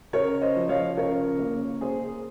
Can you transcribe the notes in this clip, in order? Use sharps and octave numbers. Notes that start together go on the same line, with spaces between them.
C#3 A#4 C#5
C5 D#5
F3
C#5 F5
C#3 A#4 C#5
A#3
A#3 G#4 C5